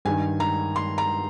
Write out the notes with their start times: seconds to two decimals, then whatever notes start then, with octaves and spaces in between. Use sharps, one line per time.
0.05 G2 D#3 G#5
0.40 A#5
0.76 C6
0.98 A#5